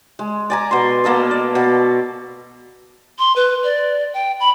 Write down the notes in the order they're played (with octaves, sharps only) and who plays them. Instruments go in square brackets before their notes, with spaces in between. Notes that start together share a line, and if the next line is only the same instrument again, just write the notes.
[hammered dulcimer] G#3
D5 G#5 A#5
B2 C6
B2 A#3 A4 D#5
D5
B2
[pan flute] C6
B4
D5
G5
B5